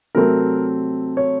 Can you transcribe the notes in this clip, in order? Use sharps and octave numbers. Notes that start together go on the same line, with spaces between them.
C3 F#3 A3 C4 A#4
C#5